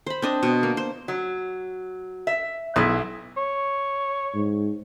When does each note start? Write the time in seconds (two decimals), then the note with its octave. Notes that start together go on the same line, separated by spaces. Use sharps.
0.07 C5 B5
0.22 C4 D4 D#5
0.43 B2
0.63 A#3
0.77 C5
1.08 F#3
2.27 E5
2.76 B1 B3 E4 G#4
3.37 C#5
4.35 G#2